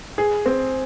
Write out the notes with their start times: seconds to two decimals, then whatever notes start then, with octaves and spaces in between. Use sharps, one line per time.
0.18 G#4
0.46 C4